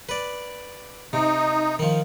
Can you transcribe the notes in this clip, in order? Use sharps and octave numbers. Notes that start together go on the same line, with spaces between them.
B4 D5
C3 D#4
D#3 F3